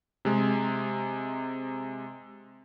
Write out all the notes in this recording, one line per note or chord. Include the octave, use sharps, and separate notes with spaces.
C3 G#3